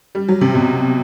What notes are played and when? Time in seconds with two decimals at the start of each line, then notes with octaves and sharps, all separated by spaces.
0.15 G3
0.28 F#3
0.41 C3
0.55 B2